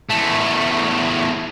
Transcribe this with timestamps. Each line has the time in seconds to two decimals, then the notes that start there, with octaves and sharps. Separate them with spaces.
0.10 E2 A3